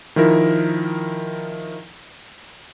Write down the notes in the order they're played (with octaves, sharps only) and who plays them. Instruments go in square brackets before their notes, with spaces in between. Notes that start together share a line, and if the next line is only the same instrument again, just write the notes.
[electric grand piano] D#3 F3 E4 A#4